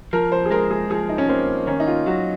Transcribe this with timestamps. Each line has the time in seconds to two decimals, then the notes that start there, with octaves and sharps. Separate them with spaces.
0.13 F3 A#4
0.32 C5
0.45 G#4
0.51 G#3 A#4
0.71 G#4
0.90 F3 G#4
1.09 D#4
1.18 C#4
1.29 A#3 C4
1.67 D#3 C#4
1.80 D#4
1.87 F4
2.06 F#3 F#4